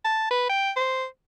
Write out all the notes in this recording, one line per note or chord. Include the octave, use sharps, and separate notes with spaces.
A5
B4
G5
C5